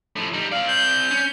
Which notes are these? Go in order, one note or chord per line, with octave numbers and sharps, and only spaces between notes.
A2 F3
G3 D#4
C4 D5 F5
G6
C#4